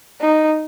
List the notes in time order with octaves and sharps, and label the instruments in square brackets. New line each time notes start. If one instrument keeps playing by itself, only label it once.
[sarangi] D#4